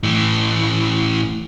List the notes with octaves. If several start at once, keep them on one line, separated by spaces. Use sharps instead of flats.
A2 E3